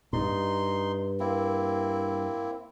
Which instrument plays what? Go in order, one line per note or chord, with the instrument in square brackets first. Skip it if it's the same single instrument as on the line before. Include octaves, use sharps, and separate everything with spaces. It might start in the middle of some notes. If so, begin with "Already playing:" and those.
[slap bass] G2 [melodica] D#4 C6
[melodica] A#3 C4 E4